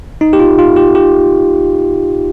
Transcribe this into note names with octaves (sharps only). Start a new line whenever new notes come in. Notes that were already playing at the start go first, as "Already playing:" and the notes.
D#4
G4
F4
F4
G4
G4